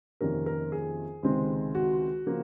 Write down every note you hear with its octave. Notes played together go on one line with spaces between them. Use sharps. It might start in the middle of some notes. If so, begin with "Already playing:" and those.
F2 C3 D#3 A#3 C#4 A#4
A#4
G#4
C#2 C3 D#3 G#3 C4
F#4
C#3 F3 A#3